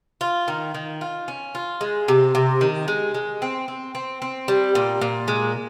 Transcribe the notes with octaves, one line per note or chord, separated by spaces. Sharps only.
F4
D#3
D#3
F4
C#4
F4
G#3
C3
C3
D#3
G#3
G#3
C4
C4
C4
C4
G3
A#2
A#2
G#3